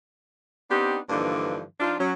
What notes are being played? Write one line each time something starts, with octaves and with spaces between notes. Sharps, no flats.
B3 C4 D4 D#4 G4
G2 D3 E3 F3 A#3 D#4
F3 D4 D#4 F4
F#3 C#4